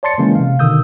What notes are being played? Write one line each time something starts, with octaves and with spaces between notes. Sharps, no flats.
C#5 D5 A5 C6 A6 C#7
C#3 E3 G#3 A#3 C#4
C3 F5
B2 D3 D#3 D#6 E6 G6